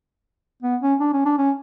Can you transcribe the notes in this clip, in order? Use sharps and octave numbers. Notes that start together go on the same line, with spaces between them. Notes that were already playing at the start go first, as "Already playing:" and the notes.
B3
C#4
D4
C#4
D4
C#4